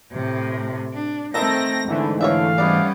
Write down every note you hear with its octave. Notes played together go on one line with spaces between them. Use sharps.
A2 C3
D4
D#3 A3 C4 A4 E5 A#6
G#2 D3 E3 A3
D3 C#5 D5 E5 F5
G3 B3 C#4 D5